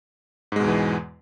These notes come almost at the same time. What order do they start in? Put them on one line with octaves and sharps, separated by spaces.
G#2 G#3 B2 E2 E3